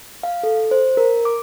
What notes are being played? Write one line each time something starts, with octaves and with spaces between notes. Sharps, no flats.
F5
A4
C5
A#4
D6